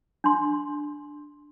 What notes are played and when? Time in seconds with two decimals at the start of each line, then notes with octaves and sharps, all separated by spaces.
0.24 D4 C6